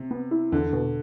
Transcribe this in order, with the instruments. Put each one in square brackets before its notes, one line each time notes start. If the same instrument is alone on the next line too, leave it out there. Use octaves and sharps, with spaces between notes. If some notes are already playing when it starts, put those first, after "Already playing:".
Already playing: [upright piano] C3
[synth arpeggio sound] B3
E4
[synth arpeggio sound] E2 [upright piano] D3
[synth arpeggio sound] B2